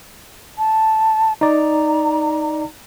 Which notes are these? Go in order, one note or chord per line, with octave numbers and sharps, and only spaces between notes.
A5
D#4 D5 A#5